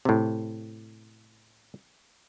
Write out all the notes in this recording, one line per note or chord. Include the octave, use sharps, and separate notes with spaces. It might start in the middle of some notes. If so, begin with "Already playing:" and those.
A2 C3